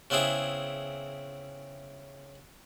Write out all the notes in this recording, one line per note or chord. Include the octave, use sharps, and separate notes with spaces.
C#3 B3 C4 E4 G#4